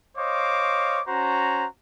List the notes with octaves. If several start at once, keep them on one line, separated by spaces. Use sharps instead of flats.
C5 C#5 D#5 F5 D6
C#4 F#4 C5 A#5